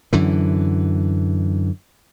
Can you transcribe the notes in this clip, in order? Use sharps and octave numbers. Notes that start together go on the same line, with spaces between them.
F#2 D3 E3